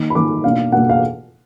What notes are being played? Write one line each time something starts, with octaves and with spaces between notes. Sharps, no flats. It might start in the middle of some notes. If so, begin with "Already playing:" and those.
Already playing: D#3 A#3 D#4
B5
D#3 A#3 D#4 D6
B2 A#3 D4 F5
B2 A#3 D4 F#5
F5